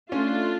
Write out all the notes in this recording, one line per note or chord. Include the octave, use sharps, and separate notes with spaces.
A3 C#4 D4 F4